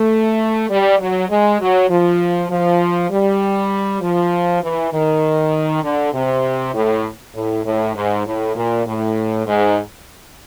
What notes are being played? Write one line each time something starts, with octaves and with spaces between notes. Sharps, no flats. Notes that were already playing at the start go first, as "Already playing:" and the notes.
Already playing: A3
G3
F#3
G#3
F#3
F3
F3
G3
F3
E3
D#3
D3
C3
A2
A2
A2
G#2
A2
A#2
A2
G#2